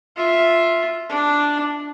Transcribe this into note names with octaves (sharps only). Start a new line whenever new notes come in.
F4 E5
D4